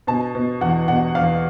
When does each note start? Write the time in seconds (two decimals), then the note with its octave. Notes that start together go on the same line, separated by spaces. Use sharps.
0.07 B2 A5
0.35 B2
0.61 E2 F#5
0.88 B2 F#5
1.15 E2 F5